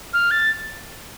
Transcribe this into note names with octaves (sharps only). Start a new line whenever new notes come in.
F6
A6